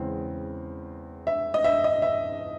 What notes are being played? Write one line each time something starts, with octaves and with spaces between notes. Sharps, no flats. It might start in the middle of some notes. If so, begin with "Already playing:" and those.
Already playing: E2 C#3 G#3 C4
E5
D#5
E5
D#5
E5